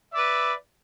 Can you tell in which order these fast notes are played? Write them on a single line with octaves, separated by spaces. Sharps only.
E5 D5 B4